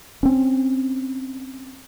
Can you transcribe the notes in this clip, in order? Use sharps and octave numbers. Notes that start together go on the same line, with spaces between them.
C4 C#4